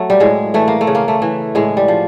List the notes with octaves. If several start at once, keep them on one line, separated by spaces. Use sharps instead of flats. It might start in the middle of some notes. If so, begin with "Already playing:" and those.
Already playing: F#3 A3
G3
A2 G#3
E3 A3
A#3
A3
C#3
A#3
A3
E3
A2 G#3
G3
F3